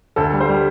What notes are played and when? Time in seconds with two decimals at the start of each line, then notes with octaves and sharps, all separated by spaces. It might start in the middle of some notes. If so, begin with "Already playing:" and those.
0.16 D2 A4
0.33 G3
0.40 C5
0.48 G3